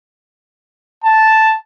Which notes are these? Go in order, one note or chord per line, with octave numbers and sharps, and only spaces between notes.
A5